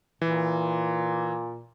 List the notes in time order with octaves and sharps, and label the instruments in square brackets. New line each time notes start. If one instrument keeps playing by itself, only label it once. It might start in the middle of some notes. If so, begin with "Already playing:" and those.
[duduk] A#2 [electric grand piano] E3